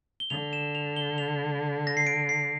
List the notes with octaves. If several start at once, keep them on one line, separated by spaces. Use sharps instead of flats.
G7
D3 F7
E7
F7
G7
F7
A#6
C7
D7
C7